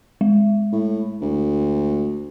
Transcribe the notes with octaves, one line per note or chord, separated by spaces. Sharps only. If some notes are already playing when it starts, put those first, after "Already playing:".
G#3
A2
D2